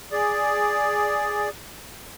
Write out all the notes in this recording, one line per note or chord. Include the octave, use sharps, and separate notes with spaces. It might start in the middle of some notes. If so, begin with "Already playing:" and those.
G#4 D5